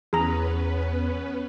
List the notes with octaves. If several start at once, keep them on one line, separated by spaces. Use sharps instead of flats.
E2 B3 C#4 G#4 B4 A#5